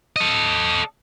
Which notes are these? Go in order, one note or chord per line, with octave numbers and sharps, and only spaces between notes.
A4 D#5